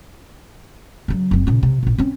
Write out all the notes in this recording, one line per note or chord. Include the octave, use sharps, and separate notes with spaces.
C#3 F#3
F#1 C4
A#2 C#3
C3
A1 A#2
C4 C#4